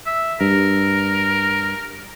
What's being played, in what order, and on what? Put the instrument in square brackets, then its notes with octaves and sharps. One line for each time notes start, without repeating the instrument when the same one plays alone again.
[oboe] E5
[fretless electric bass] G2 [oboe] A#4